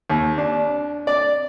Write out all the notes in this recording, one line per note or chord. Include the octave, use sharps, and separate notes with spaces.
D#2
D4
D5